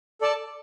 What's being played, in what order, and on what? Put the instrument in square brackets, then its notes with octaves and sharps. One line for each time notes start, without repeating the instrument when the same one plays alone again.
[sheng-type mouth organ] A4 D5 A5